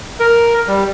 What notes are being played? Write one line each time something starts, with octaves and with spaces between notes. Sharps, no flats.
A#4
G3